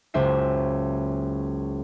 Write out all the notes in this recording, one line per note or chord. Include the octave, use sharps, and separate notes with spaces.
F#1 C#2 C5 E5 C7